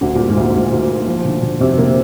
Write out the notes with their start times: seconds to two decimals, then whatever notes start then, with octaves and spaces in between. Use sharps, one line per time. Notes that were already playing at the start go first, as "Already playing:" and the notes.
0.01 D2 D3
0.15 A#2 G3
0.28 G#2
0.37 D2 A#2
0.55 D2
0.72 D2
0.90 A#3
1.07 F3
1.25 D3
1.42 D3
1.60 F2 C3
1.78 D3 A#3